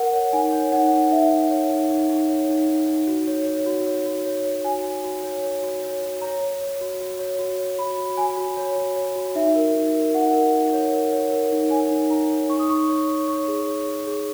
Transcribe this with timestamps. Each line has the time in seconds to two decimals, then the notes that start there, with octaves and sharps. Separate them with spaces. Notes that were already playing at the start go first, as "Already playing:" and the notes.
Already playing: A#4 F#5
0.13 C#5
0.33 D#4 G#5
0.53 C#5
0.72 D#4 F#5
0.92 D#4
1.11 D#4 E5
1.31 D#4
1.51 C#5
1.70 D#4
1.90 D#4
2.09 D#4
2.29 C#5
2.49 D#4
2.69 D#4
2.88 D#4
3.07 F#4
3.27 C#5
3.47 C#5
3.66 F#4
3.86 C#5
4.05 F#4
4.26 C#5
4.45 C#5
4.65 F#4 G#5
4.84 F#4
5.04 F#4
5.23 C#5
5.43 C#5
5.63 F#4
5.82 C#5
6.02 F#4
6.22 C#5 A#5
6.41 C#5
6.61 C#5
6.81 F#4
7.00 F#4
7.19 C#5
7.39 F#4
7.59 C#5
7.78 F#4 B5
7.98 F#4
8.17 F#4 G#5
8.37 F#4
8.57 C#5
8.76 F#4
8.96 C#5
9.16 F#4
9.35 D#4 E5
9.55 A#4
9.75 D#4
9.94 A#4
10.14 D#4 F#5
10.33 A#4
10.54 D#4
10.73 C#5
10.92 A#4
11.12 C#5
11.32 A#4
11.52 D#4
11.71 C#5 G#5
11.91 D#4
12.10 D#4 A#5
12.30 C#5
12.49 D#4 C#6
12.59 D#6
12.70 D#4 C#6
12.89 C#5
13.08 C#5
13.28 C#5 C#6
13.48 G#4
13.67 C#5
13.87 G#4
14.07 G#4